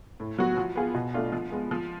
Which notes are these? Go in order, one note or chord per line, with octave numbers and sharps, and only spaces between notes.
A2
F#3 B3 F#4
F3
B3 F4 G#4
B2
A3 D4 F4
F3
G#3 B3
F3